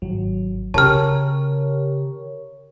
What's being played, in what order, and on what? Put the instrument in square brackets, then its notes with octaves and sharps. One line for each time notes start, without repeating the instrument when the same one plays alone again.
[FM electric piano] G#1 F#3
[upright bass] C#3 [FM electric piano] G4 A#4 C#5 [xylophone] A5 F6